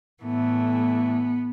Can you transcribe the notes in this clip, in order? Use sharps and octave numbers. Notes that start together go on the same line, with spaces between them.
A2 E3 A3 B3